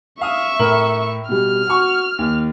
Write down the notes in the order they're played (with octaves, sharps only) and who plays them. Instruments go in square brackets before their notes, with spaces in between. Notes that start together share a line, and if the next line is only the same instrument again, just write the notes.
[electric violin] E5 C#6 [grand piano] F5 D#6
[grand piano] A2 A#4 F#7
[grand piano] B2 G3 [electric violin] F6
[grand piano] F#4 C#6
D#2